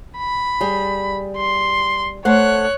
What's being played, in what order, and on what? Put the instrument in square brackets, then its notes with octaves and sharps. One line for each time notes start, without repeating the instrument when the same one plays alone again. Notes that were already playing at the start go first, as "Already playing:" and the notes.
[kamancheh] B5
[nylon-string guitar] G3 G#4
[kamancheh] C6
[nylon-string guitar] A3 C5 F#5 [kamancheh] C#5 F#6